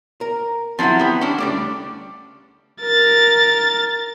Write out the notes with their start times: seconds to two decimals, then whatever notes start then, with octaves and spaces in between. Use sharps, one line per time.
0.21 A#4
0.79 F3 F#3 C4 E4 F#5
0.99 B3 G4
1.21 C#4 D4
1.38 C#2 G3 A3 D5
2.81 A#4 A6